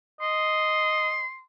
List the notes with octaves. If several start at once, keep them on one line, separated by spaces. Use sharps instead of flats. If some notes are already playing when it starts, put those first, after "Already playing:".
D#5 C6